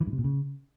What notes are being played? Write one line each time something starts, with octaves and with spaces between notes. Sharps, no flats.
E3
G2
C3
A#2
C#3